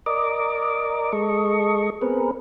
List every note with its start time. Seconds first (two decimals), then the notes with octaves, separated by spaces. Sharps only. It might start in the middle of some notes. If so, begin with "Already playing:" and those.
0.06 A#4 D5 D#5 D6
1.13 G#3 A4 D#5 C#6
2.02 B3 C4 G#4 A#4 B4